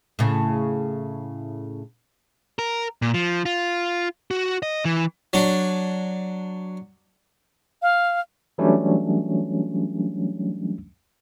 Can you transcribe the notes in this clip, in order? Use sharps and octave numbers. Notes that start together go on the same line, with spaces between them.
A2 C#3
A#4
A#2
F3
F4
F#4
D#5
E3
F#3 D4
F5
E3 F#3 G3 A3 C#4 D4